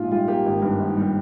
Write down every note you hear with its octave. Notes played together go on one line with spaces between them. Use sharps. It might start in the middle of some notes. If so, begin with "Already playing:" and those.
Already playing: A#1 G#2 F4
G3 F4
A#3 G4
G#1
G2
G#1
G3